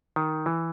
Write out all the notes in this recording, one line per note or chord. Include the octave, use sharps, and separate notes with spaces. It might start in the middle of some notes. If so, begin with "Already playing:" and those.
D#3
E3